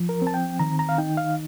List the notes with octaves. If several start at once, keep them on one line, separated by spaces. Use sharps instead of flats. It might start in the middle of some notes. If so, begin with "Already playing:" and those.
Already playing: F3
A#4
C4
A5
G5
D#3 A#5
A#5
F5
D#4 G5
F5